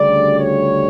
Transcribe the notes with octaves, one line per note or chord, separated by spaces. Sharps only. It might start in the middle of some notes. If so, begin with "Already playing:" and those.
Already playing: D2 C#3 G3 D5
C#5